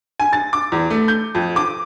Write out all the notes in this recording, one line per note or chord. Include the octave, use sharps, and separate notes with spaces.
G#5
A6
D6
E2
A3
G6
F2
D6